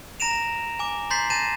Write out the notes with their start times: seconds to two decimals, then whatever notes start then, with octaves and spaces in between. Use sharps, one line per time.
0.20 A#5 A#6 D7 E7 F7
0.79 G#5 D6
1.10 A#5 C6 G6 A6 B6 C7
1.30 A5 G6 A6 A#6 D#7 E7